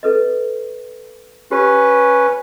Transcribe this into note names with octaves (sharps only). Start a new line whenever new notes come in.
A4 B4 D#5
C#4 G4 B4